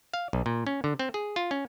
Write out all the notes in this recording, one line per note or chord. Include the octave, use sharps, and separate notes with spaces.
F5
B1
A#2
C#4
D3
C4
G#4
F4
C#4